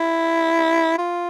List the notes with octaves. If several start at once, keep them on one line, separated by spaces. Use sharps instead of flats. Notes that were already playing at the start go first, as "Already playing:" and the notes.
Already playing: E4
F4